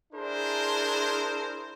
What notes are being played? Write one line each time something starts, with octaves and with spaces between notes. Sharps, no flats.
D4 E4 G#4 A#4 C5